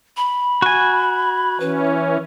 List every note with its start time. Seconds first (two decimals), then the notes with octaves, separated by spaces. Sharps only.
0.17 B5
0.62 F#4 G#5
1.60 E3 C#4 B4